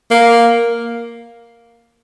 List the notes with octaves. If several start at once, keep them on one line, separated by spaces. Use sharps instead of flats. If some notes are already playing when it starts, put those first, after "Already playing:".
A#3